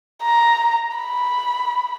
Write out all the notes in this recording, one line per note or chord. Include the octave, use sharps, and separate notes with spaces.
A#5
B5